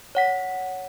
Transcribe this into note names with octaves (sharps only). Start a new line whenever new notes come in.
C#5 F#5 B6